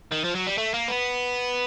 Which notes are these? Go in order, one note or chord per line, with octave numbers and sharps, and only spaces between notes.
D#3
F3
F#3
G3
A3
A#3
B3